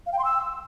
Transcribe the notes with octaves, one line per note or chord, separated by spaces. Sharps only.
F5
G5
C6
E6